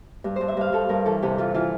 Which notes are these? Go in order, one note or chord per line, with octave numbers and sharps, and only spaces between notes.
G2
G2 C5
E5
G2 F5
G2 A4
G2 A#4
E3 A4
C3 G4
E3 F4
E3 F4